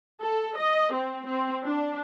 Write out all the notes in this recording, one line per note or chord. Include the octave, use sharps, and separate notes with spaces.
A4
D#5
C4
C4
D4